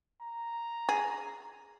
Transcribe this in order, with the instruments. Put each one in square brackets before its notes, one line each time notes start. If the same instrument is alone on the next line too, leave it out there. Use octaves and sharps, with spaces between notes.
[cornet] A#5
[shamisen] G#4